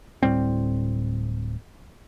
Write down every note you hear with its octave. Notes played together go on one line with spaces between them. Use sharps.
D1 A2 G3 C4